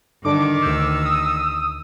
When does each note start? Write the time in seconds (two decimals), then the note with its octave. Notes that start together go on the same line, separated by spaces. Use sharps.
0.25 G2 D3 D#3 D4 D6
0.63 D2 E6 G6
1.05 D#6